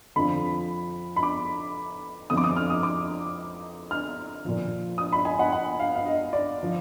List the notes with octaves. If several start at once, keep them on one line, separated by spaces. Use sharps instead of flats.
F2 D3 F3 B5
B5
D6
F2 F3 D#6
D6
D#6
F6
D#6
D6
F6
A#2 F3
D#6
B5
G#5
F#5
F#5
F5
F5
D#5
D5
F3